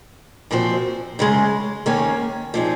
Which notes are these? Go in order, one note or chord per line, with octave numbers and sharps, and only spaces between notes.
A#2 F3 C4 F#4 C5
F#2 C#3 G#3
D#2 D#3 A#3 C#4
A#2 F3 C4 D#4 G#4